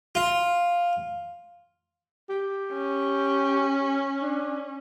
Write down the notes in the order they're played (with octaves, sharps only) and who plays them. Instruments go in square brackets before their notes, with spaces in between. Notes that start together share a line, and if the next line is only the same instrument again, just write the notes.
[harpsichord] F4
[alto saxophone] G4
[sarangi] C#4
[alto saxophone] D4